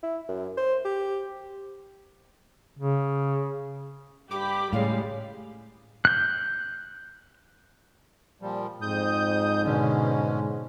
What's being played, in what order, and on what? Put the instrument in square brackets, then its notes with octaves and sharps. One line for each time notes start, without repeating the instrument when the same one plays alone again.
[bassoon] E4
F#2
C5
G4
[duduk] C#3
[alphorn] G2 [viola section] G4 B5 [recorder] D6
[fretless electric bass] A2 [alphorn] C#3 [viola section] G3 G#3 [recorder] F5
[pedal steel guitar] F#6 G6
[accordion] A#2 F3 G3
[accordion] F2 D#6 G6 [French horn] G#2
[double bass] B2 D3 [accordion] G#3 C#4